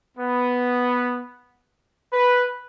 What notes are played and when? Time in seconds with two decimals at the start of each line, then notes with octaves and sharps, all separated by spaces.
0.17 B3
2.12 B4